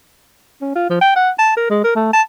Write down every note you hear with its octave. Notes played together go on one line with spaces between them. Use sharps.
C#4
F4
F3
G5
F#5
A5
A#4
G#3
A#4
A3
A5